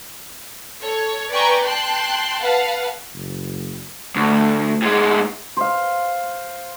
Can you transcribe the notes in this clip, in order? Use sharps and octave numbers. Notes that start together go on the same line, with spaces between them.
A4 C#5
B4 D5 G5 G#5 A#5 C#6
G5 A5 C6 F#6
B4 F5 F#5 A5
F#1
D2 A3
A2 G#3
C5 F5